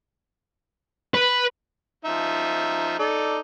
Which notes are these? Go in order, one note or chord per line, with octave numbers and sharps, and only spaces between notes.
B4
F3 D#4 E5
D#4 A4 D5